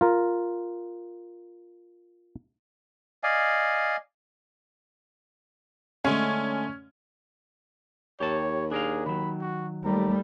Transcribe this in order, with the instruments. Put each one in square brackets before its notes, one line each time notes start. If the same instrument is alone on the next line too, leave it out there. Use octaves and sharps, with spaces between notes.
[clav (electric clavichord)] F4 A#4
[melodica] D5 D#5 F5 G#5
[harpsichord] D3 G#3 A3 [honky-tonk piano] C#4
[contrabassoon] D#2 [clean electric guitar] G4 A5 [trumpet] C#5
[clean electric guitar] D4 A#4 F5 [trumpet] G#4
[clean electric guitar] D#3 F#3 [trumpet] B5
[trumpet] F#4
[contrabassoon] D#2 [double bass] G3 A3 [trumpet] A#5